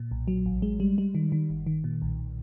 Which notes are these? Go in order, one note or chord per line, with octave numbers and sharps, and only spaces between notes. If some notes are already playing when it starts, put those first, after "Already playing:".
Already playing: A#2
B1
F#3
A1
G#3
G3
G3
D#3
D#3
G1
D#3
A#2
B1